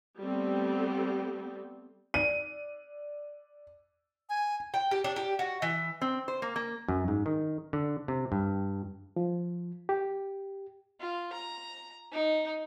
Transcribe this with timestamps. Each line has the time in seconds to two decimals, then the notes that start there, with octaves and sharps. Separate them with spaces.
0.20 G3 A3 B3 C4 A4
2.14 D5 D#7
4.29 G#5
4.74 G5
4.91 G4
5.04 D4
5.16 G4
5.39 F#4
5.62 E3
6.02 C4
6.28 C5
6.42 A#3
6.56 A#3
6.88 F#2
7.08 G#2
7.26 D#3
7.73 D3
8.08 C3
8.32 G2
9.16 F3
9.89 G4
11.00 F4
11.33 A#5
12.12 D#4